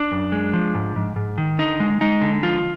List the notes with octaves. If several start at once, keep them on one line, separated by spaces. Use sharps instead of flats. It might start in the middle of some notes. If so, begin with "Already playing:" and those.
Already playing: D4
F#2
G#3
F3
G#2
G#2
G#2
D#3
D3 D#4
G#3
G#3 D#4
D3
F3 F4